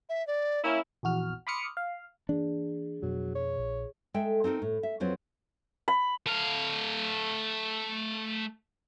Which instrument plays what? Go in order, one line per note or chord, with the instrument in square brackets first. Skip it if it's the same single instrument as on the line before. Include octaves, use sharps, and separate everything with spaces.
[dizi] E5
D5
[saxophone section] A#3 C#4 E4
[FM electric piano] A#1 E2 F#4 F6
B5 C6 D6 D#6 F6 C#7
F5
[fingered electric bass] E3 A#3 [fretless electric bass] D4 [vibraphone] G#4
[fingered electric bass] F2 B2 [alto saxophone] F#3
[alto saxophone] C#5
[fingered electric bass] A#1
[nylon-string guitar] G#3 A4 E5 G5
C4 D#4 A4 A#4
A2
E5
F2 F#3 C4 F4 B4 C#5
[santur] B5
[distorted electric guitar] A3 F5